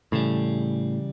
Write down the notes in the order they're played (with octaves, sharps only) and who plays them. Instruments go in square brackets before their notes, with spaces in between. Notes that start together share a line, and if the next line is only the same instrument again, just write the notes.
[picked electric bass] A2 [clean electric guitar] C#3 E3 G3